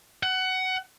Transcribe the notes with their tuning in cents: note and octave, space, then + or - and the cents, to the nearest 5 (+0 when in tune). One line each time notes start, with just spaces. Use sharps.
F#5 +20